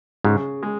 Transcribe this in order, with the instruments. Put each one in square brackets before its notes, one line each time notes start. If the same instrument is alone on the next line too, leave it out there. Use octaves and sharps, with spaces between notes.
[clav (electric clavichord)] G#2 [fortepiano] C#3
[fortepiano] G#3